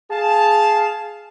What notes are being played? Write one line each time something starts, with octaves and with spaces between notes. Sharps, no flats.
G#4 F5 A5